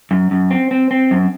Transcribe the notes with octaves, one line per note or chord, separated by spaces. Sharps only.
F#2
F#2
C4
C4
C4
F#2